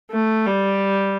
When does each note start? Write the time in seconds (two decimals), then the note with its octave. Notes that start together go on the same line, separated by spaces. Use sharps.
0.11 A3
0.46 G3